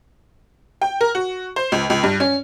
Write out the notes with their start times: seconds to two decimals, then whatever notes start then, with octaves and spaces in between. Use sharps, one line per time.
0.82 G5
1.01 A#4
1.15 F#4
1.56 C5
1.72 C#2
1.90 C#2
2.03 G2
2.20 C#4